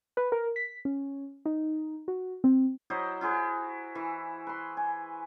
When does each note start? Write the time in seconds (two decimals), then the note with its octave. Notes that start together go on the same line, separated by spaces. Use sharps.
0.17 B4
0.32 A#4
0.56 B6
0.85 C#4
1.46 D#4
2.08 F#4
2.44 C4
2.90 F#3 E4 C5 D#5
3.21 E4 F#4 G#4 C5
3.95 E3
4.47 B4 C6
4.77 G#5